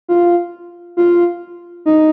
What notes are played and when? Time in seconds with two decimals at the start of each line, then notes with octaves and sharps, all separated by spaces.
0.09 F4
0.97 F4
1.86 D#4